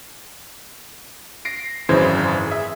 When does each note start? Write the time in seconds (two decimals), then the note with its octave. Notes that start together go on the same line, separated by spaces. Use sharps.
1.45 A#6 C7 D7
1.89 G#1 F#2 C#3 E3 C5 G#6
2.47 G#4 E5